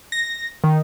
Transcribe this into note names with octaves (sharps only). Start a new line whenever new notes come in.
A#6
D#3